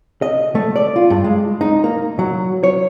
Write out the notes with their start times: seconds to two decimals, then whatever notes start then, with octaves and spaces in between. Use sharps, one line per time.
0.22 D#5
0.55 A3
0.76 D5
0.96 F4
1.10 G2
1.24 G#3
1.61 D#4
1.84 A#3
2.19 F#3
2.64 C#5